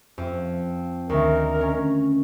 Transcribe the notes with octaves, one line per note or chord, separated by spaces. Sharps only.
F2
D2 D#3 A#4
C#4